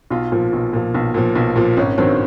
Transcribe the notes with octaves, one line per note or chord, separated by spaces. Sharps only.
B1 F4
A#2 F3
B1
A#2 F3
B1
A#2 F3
B1
A#2 F3
G#1 C#4
G2 D#3 F#3 C4